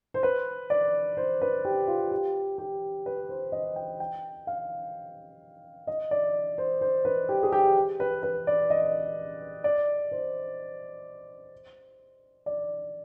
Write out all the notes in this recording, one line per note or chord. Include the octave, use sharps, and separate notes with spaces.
C5
B4
D5
C5
B4
G4
F4
G4
G4
B4
C5
D#5
G5
G5
F5
D#5
D5
C5
C5
B4
G4
G#4
G4
B4
B4
D5
D#5
D5
C5
D5